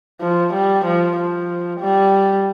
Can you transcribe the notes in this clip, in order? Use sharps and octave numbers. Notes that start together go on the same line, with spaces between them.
F3
G3
F3
F3
G3